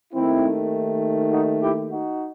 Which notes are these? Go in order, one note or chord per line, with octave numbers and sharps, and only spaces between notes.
D#2 D#3 A3 C4 E4
D#4 F#4
E4 G4
D#4 F#4